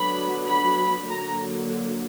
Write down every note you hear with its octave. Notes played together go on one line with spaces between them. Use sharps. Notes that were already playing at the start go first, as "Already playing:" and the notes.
Already playing: D3 F#3 B3 D4 B5
B5
D3 F#3 A#3 A#5